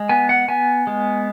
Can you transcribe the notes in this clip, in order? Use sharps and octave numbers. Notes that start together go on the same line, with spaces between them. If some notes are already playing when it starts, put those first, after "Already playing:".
Already playing: G#3
B3 G#5
F#5
B3 G#5
G#3